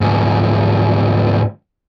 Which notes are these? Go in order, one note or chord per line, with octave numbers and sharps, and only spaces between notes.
D2 G#2